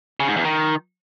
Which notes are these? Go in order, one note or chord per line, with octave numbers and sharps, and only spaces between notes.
C#3
G#2
E2
D#3